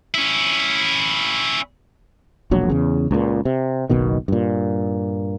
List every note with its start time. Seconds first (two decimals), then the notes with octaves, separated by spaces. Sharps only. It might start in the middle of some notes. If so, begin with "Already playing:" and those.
0.14 C#4 E4
2.51 E1 A#1 F#3
2.70 E2 C#3
3.11 C#2 A#2
3.45 C3
3.90 F#1 B1 B2 D#3
4.28 G2 A#2